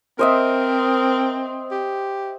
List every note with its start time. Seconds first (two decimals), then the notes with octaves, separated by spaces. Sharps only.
0.19 C4 A#4 C5 D#5 E5
1.71 G4